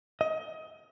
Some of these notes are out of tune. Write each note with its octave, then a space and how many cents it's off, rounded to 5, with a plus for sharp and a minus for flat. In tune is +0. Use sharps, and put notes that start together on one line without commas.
D#5 +25